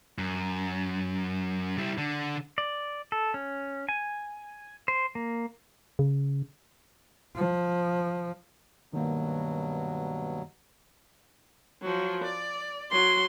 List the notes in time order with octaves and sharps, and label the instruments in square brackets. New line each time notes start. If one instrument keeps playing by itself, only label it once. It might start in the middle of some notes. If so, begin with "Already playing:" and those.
[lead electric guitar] F#2
G3 E4
D3
[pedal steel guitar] D5
A4
C#4
G#5
C5
A#3
[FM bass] C#3
[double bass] F3
[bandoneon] G2 B2 F#3 [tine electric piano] D#3 A#3
[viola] F3 F#3
D5
[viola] F#3 [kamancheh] C6